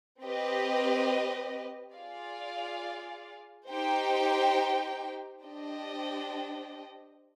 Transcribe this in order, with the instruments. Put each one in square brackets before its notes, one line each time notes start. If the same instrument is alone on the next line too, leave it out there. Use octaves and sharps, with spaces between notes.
[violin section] C4 G4 B4 D#5
F4 G#4 D5 F5
D#4 G4 C5 G5
D4 G4 C5 D#5 G5